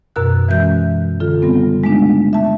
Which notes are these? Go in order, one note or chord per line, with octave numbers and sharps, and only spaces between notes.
F#2 B2 A#4 E6 F#6
E3 G#3 C#4 F#4 E5 G6
D3 F4 A4
C#3 G3 B3 C4
G#3 A3 B3 D4 D#4
E5 A5